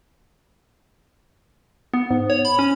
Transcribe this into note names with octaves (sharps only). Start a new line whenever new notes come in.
B3
G#2
C#5
B5
C#4